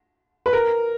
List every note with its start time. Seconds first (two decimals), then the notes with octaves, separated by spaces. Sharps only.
0.46 B4
0.53 A#4